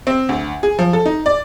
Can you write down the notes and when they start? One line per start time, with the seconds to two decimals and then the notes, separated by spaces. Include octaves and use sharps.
0.07 C4
0.29 D2
0.63 G#4
0.79 F3
0.93 A4
1.06 D#4
1.26 D5